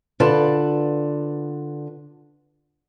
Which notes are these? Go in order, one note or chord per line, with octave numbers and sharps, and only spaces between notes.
D3 F4 B4 D5 A5